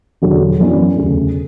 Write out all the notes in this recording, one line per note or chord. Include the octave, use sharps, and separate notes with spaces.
E1 E2 D3 F#3
F#2 E3 B3 D4
E1 D2 C#3